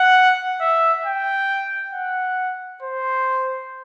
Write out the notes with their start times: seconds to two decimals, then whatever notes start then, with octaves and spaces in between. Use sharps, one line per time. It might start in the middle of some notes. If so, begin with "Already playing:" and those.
Already playing: F#5
0.61 E5
1.05 G5
1.93 F#5
2.82 C5